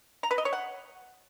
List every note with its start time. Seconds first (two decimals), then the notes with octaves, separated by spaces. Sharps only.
0.23 A#5
0.31 B4
0.38 D#5
0.45 C#5
0.53 F#5